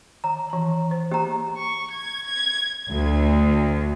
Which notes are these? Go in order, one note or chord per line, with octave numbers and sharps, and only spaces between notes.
D#3 A#5
E3 A5
C5
A#3 G4 A#5
C#6
G#6
G#6
D2